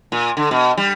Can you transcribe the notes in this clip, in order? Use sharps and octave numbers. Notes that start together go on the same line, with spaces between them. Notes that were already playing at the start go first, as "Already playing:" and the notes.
A#2
D3
B2
G3